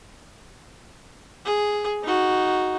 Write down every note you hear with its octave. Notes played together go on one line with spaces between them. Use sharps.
G#4
D#4 F#4